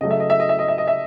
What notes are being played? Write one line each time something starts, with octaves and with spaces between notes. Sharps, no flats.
C#3 F#3 A3 D#5
E5
D#5
E5
D#5
E5
D#5
E5
D#5
E5